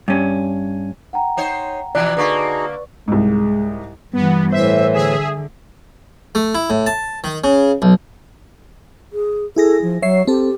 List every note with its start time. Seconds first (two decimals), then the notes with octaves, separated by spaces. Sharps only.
0.08 G2 C#4
1.13 F#5 G5 A#5
1.37 D#4 C5 C#5
1.95 B2 E3 F3 D5 A#5 F#6
2.17 D3 A#3 D#4 F#4 G#4 B4 C#6
3.08 C2 G#2 G#3
4.13 G2 E3 B3
4.52 A2 E3 C5 E5
4.92 D3 G#4 E5
6.35 A3
6.55 E4
6.70 A2
6.86 A5
7.24 D#3
7.44 C#3
7.82 B1
9.13 G#4
9.56 E4 G#4 A4 A#6
9.82 F3
10.02 F#3 C#5 E5 C7
10.27 C4 G4 A4